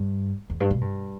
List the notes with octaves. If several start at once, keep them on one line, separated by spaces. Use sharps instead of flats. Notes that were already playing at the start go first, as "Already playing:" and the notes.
Already playing: G2
E2
G2
B2
G2